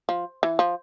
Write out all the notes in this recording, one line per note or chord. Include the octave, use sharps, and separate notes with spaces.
F3
E3
F3